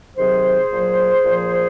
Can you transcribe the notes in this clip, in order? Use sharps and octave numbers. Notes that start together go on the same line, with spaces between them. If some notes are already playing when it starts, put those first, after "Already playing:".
C3 D#3 F#3 G#4 C5
A#2 F#3
A#2 F3